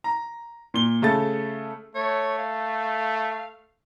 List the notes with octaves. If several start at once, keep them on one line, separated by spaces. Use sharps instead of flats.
A#5
A#2 G7
C#3 A3 A4 A6
A3 C#5
F5